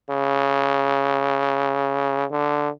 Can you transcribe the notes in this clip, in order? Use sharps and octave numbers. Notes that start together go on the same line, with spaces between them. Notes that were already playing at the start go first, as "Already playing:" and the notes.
C#3
D3